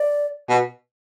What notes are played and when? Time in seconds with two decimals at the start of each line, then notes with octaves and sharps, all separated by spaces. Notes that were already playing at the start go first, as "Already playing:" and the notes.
Already playing: D5
0.49 B2